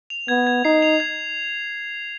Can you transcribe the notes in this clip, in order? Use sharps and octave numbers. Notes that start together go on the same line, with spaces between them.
F7
B3 G#6
G#6
D#4 C7
F7
G#6